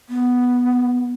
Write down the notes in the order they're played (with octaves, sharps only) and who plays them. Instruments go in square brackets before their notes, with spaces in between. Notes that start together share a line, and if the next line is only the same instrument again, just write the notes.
[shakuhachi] B3